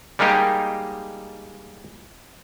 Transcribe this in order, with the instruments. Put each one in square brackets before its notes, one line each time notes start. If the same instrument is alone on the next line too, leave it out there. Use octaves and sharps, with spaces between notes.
[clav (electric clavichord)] G3 G#3 A#3 D#4 G4